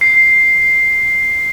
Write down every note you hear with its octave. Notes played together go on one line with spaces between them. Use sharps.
C7